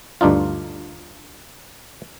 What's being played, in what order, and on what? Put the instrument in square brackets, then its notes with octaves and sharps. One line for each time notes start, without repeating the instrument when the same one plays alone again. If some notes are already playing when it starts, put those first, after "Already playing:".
[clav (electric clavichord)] D2 G2 D4 D#4 F4